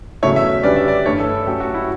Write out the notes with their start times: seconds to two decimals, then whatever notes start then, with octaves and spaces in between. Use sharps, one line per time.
0.22 E2 C#3 F#3 A3 E4 C#5
0.36 E5
0.63 D3 G3 C#4 G4 B4 D5
0.76 E5
0.88 D5
1.06 G2 E3 A3 C#5
1.20 A4
1.46 F#3 A3 C#4 G4
1.60 F#4
1.74 E4